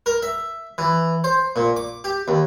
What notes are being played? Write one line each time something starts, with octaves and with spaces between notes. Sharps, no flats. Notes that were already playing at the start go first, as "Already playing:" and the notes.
A#4
E5
E3
C5
A#2
D6
G4
D#2